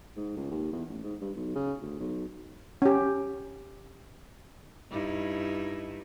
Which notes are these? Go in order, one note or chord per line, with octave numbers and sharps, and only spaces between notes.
G#2
C#2
D#2
E2
A1
G#2
G2
B1
C#3
D2
B1
C#4 G4
G2 D#4 E4